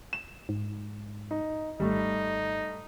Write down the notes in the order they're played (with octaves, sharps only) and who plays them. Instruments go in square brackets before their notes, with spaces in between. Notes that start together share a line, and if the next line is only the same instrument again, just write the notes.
[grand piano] E7
[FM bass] G#2
[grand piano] D#4
[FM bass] G#1 [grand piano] G3 A3 [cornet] D#4